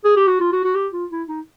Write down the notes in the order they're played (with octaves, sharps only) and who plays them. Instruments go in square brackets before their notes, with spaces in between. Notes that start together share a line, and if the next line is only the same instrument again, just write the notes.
[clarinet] G#4
G4
F#4
F4
F#4
F#4
G4
F4
E4
D#4